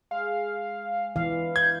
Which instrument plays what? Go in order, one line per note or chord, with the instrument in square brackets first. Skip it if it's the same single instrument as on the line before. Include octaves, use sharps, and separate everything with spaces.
[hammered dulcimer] G#3 [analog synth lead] F5
[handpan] E3 F5 [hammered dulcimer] D4
[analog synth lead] G6 [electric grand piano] G#6